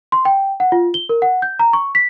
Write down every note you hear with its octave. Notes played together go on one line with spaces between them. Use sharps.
C6
G5
F#5
F4
G7
A#4
F#5
G6
A#5
C#6
B6